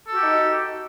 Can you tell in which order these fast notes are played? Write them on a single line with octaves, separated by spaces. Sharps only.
A4 F#4 G4 D#4